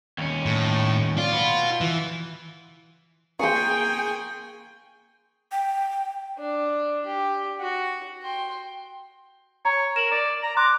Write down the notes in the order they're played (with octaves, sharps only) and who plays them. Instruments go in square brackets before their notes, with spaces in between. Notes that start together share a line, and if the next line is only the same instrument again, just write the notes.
[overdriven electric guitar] D#2 C#4
[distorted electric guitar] A2
[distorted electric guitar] F4 [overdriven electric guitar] D5
[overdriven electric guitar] F#4 B4
[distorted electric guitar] E3
[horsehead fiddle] A#3 G5 [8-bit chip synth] G#4 G#5 [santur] C6 C#6
[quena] G5
[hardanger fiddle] D4
G4
F#4
G5 C6
[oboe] C#5 [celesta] A#5
[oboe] A#4 [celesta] E7 F#7
[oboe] D5
A#5
[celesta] C6 F#6 [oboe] D6